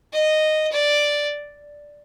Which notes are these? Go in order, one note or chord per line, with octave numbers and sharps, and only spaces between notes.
D#5
D5